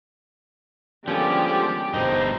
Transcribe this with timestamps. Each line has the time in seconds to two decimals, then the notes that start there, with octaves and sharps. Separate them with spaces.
1.08 D3 F3 G3 G#3 A#3 B3 C#4 G4
1.94 G1 G2 B2 D#4 C5 D#5